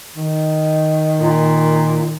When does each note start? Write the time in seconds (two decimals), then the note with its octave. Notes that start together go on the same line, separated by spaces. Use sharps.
0.16 D#3
1.20 A#2